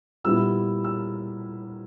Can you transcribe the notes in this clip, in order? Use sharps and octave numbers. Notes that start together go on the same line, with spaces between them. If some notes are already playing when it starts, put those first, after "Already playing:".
A#2 G3 B3 E4 E6
E6